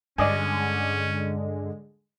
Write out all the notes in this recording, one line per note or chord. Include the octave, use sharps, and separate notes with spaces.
G2 D3 G#3 C#4 D5 D#5 G#5